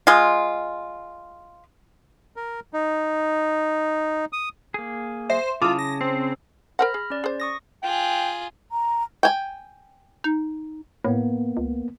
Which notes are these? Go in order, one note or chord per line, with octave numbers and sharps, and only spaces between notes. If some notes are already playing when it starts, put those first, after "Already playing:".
G#3 F4
A#4
D#4
D#6
A#3 G#4
C5 E5
C#3 E4 F4 A5 D6 D#6
A#6
C4
A#4 C5 F#5 B5 F6 A#6
G#4
C#4 D5
G#4 C5
C#6 D#6 A#6
F4 G#4 G5
A#5
G5 G#5
D#4
A2 A#3 B3
C#2